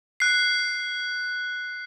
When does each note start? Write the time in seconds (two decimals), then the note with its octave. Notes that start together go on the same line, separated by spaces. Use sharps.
0.20 F#6 C7